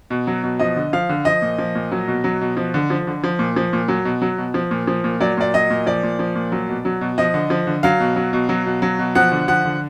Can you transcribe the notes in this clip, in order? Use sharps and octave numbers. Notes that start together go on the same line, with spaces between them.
B2
F#3
B2
F3 D#5
D3
F3 F5
D3
F3 D#5
A#2
F3
A#2
F#3
B2
F#3
B2
F3
D3
F3
D3
F3
A#2
F3
A#2
F#3
B2
F#3
B2
F3
A#2
F3
A#2
F#3 D5
A#2 D5
F#3 D#5
A#2
F3 D5
A#2
F3
A#2
F#3
B2
F#3
B2
F3 D#5
D3
F3
D3
F#3 F5
B2
F#3
B2
F#3
B2
F#3
B2
F3 F#5
D3
F3 F#5
D3